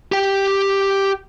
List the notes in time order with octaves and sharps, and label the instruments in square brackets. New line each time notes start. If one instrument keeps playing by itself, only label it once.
[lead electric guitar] G4 G5